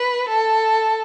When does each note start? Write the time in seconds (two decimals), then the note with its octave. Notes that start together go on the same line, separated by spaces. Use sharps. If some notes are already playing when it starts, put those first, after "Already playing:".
Already playing: B4
0.29 A4